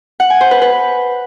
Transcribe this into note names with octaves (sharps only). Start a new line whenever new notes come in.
F#5
G#5
C5
B4
B4